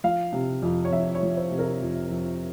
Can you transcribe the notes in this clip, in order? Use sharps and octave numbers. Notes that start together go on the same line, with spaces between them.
F3 F5
C3
F2
C#5
F2 E5
C#5
F3
C5
C3
A#4
F2
F2